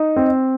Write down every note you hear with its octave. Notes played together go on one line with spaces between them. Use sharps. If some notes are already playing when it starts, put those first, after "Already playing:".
Already playing: D#4
C4